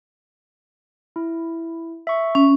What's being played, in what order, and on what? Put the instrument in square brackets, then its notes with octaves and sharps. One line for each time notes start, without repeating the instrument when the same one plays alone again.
[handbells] E4
E5 C#6
[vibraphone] C#4